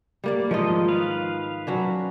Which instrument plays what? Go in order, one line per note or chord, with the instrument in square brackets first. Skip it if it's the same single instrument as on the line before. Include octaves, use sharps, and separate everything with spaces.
[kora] G3 A#3 D5
[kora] G#2 D#3 F4 [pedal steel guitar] F3 D#5
[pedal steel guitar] B4 F5
[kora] F#3 C#4 D4